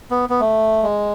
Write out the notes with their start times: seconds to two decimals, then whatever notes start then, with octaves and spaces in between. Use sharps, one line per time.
0.11 B3
0.29 B3
0.41 A3
0.83 G#3